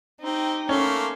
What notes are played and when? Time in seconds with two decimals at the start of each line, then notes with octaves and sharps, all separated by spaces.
0.20 C4 D#4 G4
0.69 A3 A#3 C#4 C6